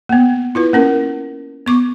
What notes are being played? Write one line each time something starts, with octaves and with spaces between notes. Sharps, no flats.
A#3 B3
E4 F4 B4
A#3 C#4 A#4
B3 C#6 D6